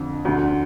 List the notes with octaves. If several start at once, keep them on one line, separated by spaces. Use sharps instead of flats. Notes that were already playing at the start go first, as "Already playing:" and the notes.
Already playing: F2 D3
D2 D3